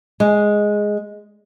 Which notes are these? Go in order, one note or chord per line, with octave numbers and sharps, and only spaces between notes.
G#3